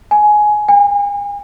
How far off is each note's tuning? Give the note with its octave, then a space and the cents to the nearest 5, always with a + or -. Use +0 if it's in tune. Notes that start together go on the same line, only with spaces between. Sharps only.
G#5 +15
G#5 -40